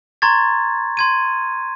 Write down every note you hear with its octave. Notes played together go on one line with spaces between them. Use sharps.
A#5 C6 C#6 G#6 A6
C6 G#6 D#7